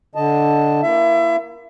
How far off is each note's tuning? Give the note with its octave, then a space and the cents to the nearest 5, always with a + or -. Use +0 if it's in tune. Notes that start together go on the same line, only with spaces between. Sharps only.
D3 -5 D#5 +0 A5 +0
A#3 +15 E4 +25 E5 +30